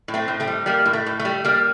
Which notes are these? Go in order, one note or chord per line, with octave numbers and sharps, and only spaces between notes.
A2
A3 C4
A2
A3 C4
G3
G3 A#3
A2
A3
A2
A3
G3
G3 A#3